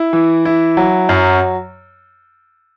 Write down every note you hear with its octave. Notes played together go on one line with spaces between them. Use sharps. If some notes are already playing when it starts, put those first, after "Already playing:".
Already playing: E4
E3
E4
F#3
F#2